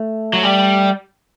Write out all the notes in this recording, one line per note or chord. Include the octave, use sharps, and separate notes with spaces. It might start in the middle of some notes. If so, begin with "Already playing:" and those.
Already playing: A3
F#3
G3